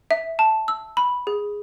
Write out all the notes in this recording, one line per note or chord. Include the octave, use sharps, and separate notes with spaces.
E5
A5
E6
B5
G#4